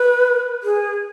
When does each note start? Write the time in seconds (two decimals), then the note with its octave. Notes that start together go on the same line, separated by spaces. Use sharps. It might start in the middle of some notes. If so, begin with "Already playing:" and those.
Already playing: B4
0.63 G#4